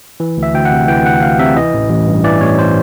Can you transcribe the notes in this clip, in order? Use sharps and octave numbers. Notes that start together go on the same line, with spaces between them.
E3
D2
E5
D2 G5
F#5
C3
E3 G5
D2 F#5
D2 F5
C3 E5
E3 D#5
A1
A1
G2
E3 D5
A1 C#5
C5